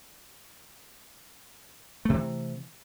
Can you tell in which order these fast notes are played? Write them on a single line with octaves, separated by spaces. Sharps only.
A3 C3 E3